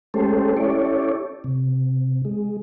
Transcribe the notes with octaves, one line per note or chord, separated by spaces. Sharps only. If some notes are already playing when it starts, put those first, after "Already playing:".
G#3 A3 C#4 G4 A4 C5
C#4 E4 G4 A4 C#5 D5
C3
G#3